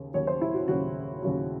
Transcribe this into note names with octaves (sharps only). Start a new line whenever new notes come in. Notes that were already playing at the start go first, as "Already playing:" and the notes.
Already playing: D#2 C#3
D#2 C#3 F#3 C#5
C5
E4
F#4
D#2 C#3 F#3 F#4
D#2 C#3 F#3